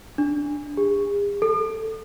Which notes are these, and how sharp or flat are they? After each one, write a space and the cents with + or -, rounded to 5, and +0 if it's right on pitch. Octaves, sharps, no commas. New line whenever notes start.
D4 -10
G#4 -45
A4 +10